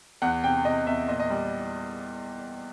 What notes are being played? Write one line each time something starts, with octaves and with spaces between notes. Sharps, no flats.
E2 F#5
C3 G5
C3 D#5
E2 E5
A#2 D#5
D#5
G3